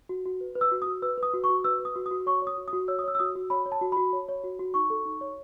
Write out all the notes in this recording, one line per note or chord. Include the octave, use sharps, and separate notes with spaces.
F#4
F#4
B4
B4
E6
F#4
D#6
F#4
B4 E6
B4
D#6
F#4
C#6
F#4
B4 E6
B4
D#6
F#4
D#6
F#4
C#5 C#6
C#5 D#6
F#4
D#6
F#4
C#5 E6
D#6
C#5 E6
E6
F#4 D#6
F#4
C#5 B5
C#5
A5
F#4
F#4 B5
C#5
C#5
F#4
F#4
D#4 C#6
A4
D#4
C#5